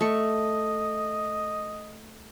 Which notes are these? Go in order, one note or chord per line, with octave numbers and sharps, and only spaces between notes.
A3 D#5 C#6